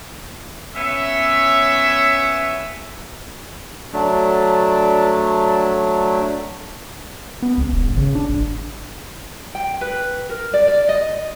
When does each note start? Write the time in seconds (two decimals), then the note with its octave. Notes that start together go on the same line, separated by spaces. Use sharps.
0.76 B3 C#4 C#5 E5
3.93 F#3 A3 D4
7.42 B3
7.58 C#2
7.72 E1
7.83 G#1
7.97 C#3
8.15 D4
8.29 G#1
9.55 G5
9.81 B4
10.29 A#4
10.54 D5
10.68 D5
10.89 D#5